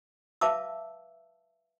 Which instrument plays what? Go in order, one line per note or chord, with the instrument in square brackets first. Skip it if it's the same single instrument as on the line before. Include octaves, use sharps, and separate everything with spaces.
[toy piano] B4 E5 F5 A5 D6 E6